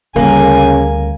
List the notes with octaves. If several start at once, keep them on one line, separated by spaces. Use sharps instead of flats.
D2 C#3 G3 A#3 G#5